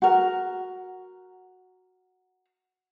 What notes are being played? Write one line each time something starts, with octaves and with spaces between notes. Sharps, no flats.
F#4 A#4